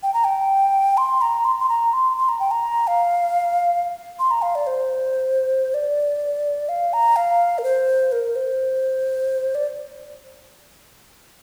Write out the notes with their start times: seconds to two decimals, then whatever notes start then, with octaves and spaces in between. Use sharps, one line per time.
0.03 G5
0.14 A#5
0.24 G5
0.97 C6
1.21 A#5
1.44 C6
1.60 C6
1.69 A#5
1.93 C6
2.17 C6
2.29 A#5
2.40 G5
2.51 A#5
2.87 F5
4.19 C6
4.31 A#5
4.42 F5
4.55 D5
4.67 C5
5.74 D5
6.69 F5
6.93 A#5
7.16 F5
7.58 A#4
7.64 C5
8.12 A#4
8.36 C5
9.55 D5